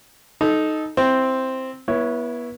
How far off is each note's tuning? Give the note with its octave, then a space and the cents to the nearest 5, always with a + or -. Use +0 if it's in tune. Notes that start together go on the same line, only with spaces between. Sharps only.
D#4 +0 A4 -20
C4 +0 E4 +0
B3 -30 E4 +0 C#5 +0